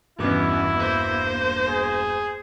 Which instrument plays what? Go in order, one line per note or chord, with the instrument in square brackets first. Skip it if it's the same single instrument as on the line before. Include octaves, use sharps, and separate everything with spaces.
[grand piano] E1 G2 D6 [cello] B2 E3 [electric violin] B3 C#4 [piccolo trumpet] E4
[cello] A#3 [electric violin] C5
[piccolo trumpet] G#4